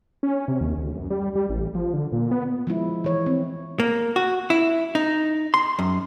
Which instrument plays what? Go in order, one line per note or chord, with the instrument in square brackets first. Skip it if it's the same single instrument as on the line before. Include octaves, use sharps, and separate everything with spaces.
[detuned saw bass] C#4
C3
D#2
D2
F#2
G3
G3
A1
F3
D3
A#2
B3
[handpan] F3 G#3 E4
E3 C#5
C4
[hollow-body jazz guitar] A#3
F#4
E4
D#4
C6
F#2